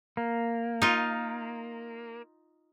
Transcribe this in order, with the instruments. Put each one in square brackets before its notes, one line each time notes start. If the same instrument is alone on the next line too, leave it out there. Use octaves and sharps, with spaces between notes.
[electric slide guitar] A#3
[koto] D#4 F4